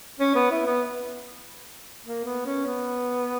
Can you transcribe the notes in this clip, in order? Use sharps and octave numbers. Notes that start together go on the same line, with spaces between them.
C#4
B3
E4
B3
A#3
B3
C#4
B3